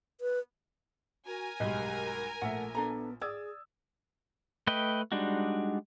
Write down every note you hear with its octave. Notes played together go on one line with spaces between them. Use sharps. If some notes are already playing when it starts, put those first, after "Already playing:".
B4
F#4 A#4 G#5
B1 G2 G#3 G4 D#5
A#1 A3 E5 F#5
B3 D4 A4 A#5
G#4 D5 D#6 E6 G#6
A3 B4 D#5 G5
G3 G#3 D4 D#4 F#4